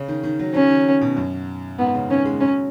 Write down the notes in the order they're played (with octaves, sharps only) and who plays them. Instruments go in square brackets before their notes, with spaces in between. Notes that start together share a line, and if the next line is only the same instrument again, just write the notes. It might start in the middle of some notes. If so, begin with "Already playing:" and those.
Already playing: [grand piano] C#3
D#3
D#3
F#3
[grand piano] F#3 [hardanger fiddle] C#4
[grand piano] D#3
B2
F#2
[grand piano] G#2 [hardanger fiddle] B3
[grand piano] C#3
[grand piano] D#3 [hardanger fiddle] C#4
[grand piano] G#3
[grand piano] F#3 [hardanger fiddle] C#4